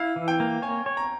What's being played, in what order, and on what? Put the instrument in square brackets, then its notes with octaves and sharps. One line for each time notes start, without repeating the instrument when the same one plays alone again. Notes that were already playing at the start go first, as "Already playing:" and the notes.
Already playing: [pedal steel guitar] E4 [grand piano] F5
[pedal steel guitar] E3
[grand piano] G5
[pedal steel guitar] A#3
[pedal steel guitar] C#5 [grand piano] G#5
[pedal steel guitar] C#5
[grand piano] A#5